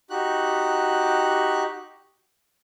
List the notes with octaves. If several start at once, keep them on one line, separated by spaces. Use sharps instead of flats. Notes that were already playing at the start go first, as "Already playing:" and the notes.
D#4 F#4 G4 F#6